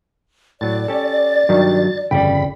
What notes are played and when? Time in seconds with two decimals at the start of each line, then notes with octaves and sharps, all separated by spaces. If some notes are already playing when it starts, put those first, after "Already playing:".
0.61 A2 F#3 D5 A6
0.88 C#4 G4 A4
1.49 G2 D#3 F#3 G3
2.11 G1 F2 C#3 D5 G5 B5